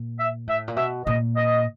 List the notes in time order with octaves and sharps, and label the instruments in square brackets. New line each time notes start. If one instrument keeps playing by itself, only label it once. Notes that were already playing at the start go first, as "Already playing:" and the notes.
Already playing: [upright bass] A#2
[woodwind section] E5
[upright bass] A2 [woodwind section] E5
[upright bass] A#2
[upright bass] B2 [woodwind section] E5
[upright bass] A#2 [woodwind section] D#5
[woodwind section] D#5